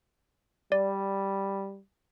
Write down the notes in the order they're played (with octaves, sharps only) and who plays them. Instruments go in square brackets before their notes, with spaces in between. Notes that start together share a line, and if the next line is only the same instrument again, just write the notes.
[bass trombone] G3 [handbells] D5